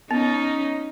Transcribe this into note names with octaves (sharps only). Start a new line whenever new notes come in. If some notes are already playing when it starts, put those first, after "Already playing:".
B3 C#4 D#4